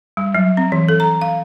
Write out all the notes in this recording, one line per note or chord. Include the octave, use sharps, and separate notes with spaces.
G3
F#3
C4
E3
A4
A#5
F5